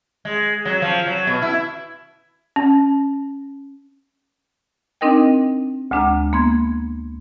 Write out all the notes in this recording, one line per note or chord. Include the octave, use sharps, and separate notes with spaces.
G#3
F#3
F3
F#3
B2
E4
C#4
C4 D4 D#4 A#4 D#5 G5
D2 G#3 D4 A#5 F6
A#3 B3 C6 G#6